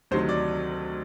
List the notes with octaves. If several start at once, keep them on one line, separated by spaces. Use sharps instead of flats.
D2 C3 D#3 F#3 C5
D5